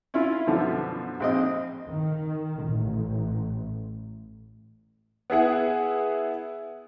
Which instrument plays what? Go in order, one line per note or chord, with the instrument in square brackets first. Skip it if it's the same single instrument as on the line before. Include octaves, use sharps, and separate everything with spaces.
[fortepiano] C#4 E4 F4
F#2 B2 D3 F3
A#1 C4 D#5
[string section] D#3
A1
[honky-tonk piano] B3 E4 G#4 F#5